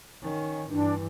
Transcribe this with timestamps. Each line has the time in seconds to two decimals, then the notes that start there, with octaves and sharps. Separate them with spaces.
0.22 D#3 C#4
0.69 G2 E3 D4